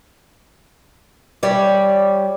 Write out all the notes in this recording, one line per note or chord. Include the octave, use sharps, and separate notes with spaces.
G3 C#5 D5